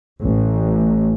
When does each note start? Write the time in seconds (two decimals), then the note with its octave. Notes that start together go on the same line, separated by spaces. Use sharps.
0.23 A1